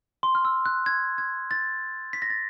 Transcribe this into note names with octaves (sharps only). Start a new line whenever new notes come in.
C6
F6
E6
F#6
G#6
G#6
A6
B6
A#6
A6